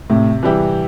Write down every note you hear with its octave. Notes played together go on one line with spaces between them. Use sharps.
A2 C3
E3 G3 E4 G4